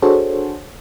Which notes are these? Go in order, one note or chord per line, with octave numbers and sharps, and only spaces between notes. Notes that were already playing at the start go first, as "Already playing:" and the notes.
D4 F#4 G#4 A4 C5 C#5